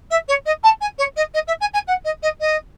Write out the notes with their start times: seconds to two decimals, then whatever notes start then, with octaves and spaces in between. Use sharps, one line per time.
0.10 E5
0.28 C#5
0.45 D#5
0.63 A5
0.81 G#5
0.98 C#5
1.16 D#5
1.34 D#5
1.47 E5
1.60 G#5
1.73 G#5
1.87 F#5
2.04 D#5
2.22 D#5
2.40 D#5